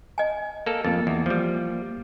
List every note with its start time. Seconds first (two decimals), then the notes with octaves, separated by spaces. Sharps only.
0.18 D#5 G#5
0.66 A#3 A4
0.85 F2 A#3 A6
1.07 E2
1.26 F3 G3